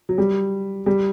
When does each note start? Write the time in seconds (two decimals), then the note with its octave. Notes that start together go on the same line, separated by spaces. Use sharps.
0.09 F#3
0.18 G3
0.86 G3